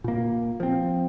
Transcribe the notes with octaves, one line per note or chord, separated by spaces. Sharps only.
A#2 A#3
F3 C4